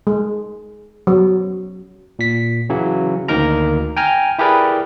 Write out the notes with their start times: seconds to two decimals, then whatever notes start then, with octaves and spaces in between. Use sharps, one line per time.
0.07 G#3
1.07 F#3
2.19 A#2 B6
2.69 C#3 E3 F#3
3.28 D2 D#3 A#3 D#4 A#4 A#5
3.97 G5 G#5 A#5 F6
4.39 E4 G4 G#4 A#4 B4 D5